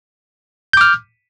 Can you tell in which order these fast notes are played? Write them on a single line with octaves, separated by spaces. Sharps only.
G6 D6 F6